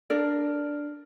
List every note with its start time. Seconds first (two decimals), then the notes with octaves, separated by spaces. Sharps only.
0.10 D4 A#4 D5